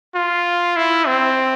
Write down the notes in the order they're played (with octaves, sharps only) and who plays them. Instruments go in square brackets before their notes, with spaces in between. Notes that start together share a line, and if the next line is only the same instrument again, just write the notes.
[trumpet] F4
E4
C4